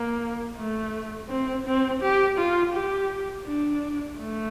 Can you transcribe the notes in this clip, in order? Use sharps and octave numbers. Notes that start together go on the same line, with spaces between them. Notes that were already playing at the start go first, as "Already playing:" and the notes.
Already playing: A#3
A3
C4
C4
G4
F4
G4
D4
A3